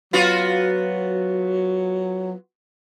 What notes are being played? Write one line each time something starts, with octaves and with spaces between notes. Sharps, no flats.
F#3 B3 F4 F#4